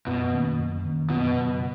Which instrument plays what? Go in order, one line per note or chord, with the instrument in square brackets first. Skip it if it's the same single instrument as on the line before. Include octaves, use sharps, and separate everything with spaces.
[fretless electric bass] F#2 [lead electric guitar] B2
[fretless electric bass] D#3 A#3 C#4
F#2
D#3 A#3 C#4
[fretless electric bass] F#2 [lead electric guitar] B2
[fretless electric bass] C#3 F#3 B3